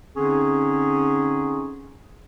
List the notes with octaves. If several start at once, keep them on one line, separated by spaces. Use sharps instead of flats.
D3 C4 C#4 D#4 G#4